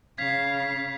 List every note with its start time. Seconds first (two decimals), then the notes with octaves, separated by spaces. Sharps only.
0.18 C#3 F5 G#6 B6